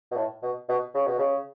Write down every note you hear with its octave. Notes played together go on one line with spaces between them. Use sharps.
B2
A2
B2
B2
C#3
B2
C#3